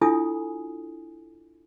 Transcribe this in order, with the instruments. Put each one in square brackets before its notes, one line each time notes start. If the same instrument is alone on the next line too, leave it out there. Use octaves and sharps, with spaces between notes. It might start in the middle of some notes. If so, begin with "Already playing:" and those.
[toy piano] D4 E4 F4 A4 G#5 D#6